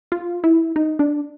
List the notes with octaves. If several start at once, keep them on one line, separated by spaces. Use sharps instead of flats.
F4
E4
D#4
D4